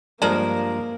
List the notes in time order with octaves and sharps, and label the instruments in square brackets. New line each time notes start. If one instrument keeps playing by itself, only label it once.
[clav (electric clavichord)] G2 F3 G#3 [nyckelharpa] A#3 [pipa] A#4 [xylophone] D5 A5 F#7